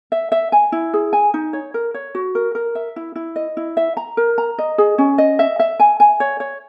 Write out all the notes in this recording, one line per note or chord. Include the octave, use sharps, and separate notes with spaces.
E5
E5
G#5
E4
G#4
G#5
D#4
C#5
A#4
C#5
F#4
A#4
A#4
E5
E4
E4
D#5
E4
E5
A#5
A#4
A#5
D#5
G#4
C#4
D#5
E5
E5
G#5
G#5
C#5
C#5